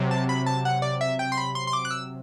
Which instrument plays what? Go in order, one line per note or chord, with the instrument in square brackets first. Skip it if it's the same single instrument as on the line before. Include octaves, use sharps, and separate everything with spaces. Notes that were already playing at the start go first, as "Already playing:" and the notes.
Already playing: [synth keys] C3 F#3
A5
B5
A5
F#5
D5
E5
G5
C6
B5
C6
C6
D6
F#6
E6